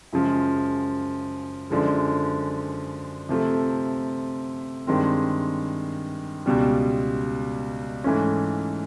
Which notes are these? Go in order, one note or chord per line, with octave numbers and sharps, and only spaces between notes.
F#2 C#3 F3 G#3
F#2 D3 F3 G#3
C3 F3 A3
G2 D#3 G#3 C4
C#2 B2 G3
G#2 E3 A3 C#4